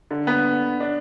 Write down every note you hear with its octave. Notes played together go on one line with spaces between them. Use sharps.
D3
B3
D4